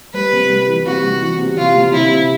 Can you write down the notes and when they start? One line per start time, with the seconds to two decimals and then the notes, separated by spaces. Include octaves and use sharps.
0.14 G3 B4
0.32 C3
0.49 G3
0.68 E3
0.85 C3 F#4
1.03 G3
1.22 E3
1.39 C3
1.57 C3 F4
1.76 C3
1.93 C3 E4
2.11 C3